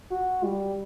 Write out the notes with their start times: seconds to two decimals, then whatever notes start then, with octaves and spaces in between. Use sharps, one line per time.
0.11 F#4
0.44 G3